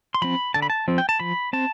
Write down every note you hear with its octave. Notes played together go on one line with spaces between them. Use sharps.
C6
F3 C4 B5
D3 A5
B5
A5
F3 C4
G5
A5
F3 B5
C4 A5